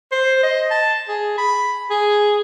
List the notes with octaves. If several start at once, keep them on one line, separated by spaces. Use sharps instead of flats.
C5
D#5
A5
G#4
B5
G#4